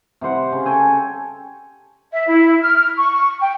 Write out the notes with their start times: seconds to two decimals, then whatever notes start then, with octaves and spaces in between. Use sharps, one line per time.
0.21 C3 G3 C5 F#5
0.52 C#3
0.66 A4 C#5 G5 G#5
2.12 E5
2.28 E4
2.62 F6
2.98 C#6
3.40 G5